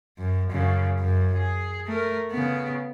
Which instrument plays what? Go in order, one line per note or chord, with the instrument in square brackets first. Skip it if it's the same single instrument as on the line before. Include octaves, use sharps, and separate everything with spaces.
[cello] F#2
F#2 C#3
F#2
G#4
A3 A#4
C#3 B3